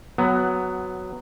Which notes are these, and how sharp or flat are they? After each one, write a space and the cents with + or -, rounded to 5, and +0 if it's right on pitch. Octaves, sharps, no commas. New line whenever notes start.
F#3 +0 B3 +15